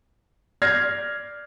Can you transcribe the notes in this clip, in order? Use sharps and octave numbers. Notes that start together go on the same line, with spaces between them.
D5 F6 G6 G#6 A#6 C7